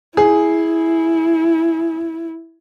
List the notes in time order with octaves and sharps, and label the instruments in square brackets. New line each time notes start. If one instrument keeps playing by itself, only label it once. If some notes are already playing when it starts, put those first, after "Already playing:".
[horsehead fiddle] E4 [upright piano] G#4